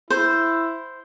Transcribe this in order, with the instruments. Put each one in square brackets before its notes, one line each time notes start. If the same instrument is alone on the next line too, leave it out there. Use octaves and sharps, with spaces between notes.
[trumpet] E4 [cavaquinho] C5